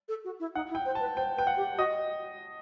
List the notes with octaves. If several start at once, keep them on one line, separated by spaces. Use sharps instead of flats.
A4
F#4
E4
D#4 F#5
E4
G5
C5
A5
B4
C5 G5
B4 G5
F#5
G4
F#4 D#5